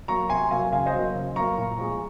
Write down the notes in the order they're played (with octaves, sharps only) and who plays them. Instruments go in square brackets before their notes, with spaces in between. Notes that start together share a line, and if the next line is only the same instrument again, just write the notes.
[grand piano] F#3 A#3 A#5 C#6
C3 G#5 C6
F#3 A#3 F5 G#5
C#3 F5 G#5
C5 D#5
F#3 A#3
C#3
F#3 A#3 A#5 C#6
A#2
F3 G#3